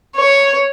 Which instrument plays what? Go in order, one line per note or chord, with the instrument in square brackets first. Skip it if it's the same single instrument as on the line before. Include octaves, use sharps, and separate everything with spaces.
[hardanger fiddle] C#5